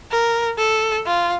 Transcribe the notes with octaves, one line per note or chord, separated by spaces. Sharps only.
A#4
A4
F4